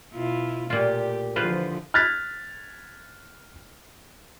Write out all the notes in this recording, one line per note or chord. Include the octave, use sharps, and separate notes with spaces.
B2 E4 F4
A#2 A3 F4 G4
D3 E3 F3 F4 B4 C5
F6 F#6 G#6 A6 B6